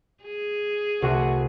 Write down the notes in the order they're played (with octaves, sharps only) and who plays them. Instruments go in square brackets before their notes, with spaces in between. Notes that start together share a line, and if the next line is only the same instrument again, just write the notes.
[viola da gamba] G#4
[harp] C2 [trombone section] A3 F#4